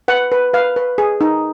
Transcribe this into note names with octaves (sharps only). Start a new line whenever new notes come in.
B4 F#5
B4
B4 F5
B4
G#4
D#4